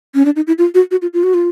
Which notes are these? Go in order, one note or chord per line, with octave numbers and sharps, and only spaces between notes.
C#4
D4
D#4
E4
F4
F#4
F#4
F4
F4
F#4
F4